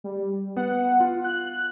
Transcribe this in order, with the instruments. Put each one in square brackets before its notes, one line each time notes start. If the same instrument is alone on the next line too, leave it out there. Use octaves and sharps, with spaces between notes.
[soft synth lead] G3
[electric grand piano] B3 [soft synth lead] F#5
[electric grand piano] F4
[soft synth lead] F#6